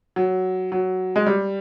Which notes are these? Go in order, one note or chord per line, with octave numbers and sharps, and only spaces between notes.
F#3
F#3
G#3
G3